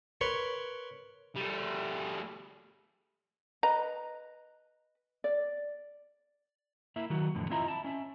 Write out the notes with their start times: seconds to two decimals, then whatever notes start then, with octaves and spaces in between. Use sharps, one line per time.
0.21 A#4 B4 C#5 C6 C#6
1.36 G3 A3
3.63 B4 D#5 A#5
5.24 D5
6.96 A#3 E4 E5
7.10 D#3 F#3 F#4
7.35 F2 A2 D3
7.50 C4 E4 F4 D#5 E5 A#5
7.68 E4 A5
7.84 C#4 E5